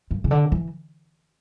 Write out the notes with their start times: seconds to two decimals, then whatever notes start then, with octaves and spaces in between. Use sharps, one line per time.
0.11 G2
0.24 C#3
0.31 D3
0.52 E3